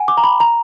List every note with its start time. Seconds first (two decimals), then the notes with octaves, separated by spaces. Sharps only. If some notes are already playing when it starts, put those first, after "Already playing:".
Already playing: F#5 G#5
0.08 D6
0.17 A#5
0.24 B5
0.40 A#5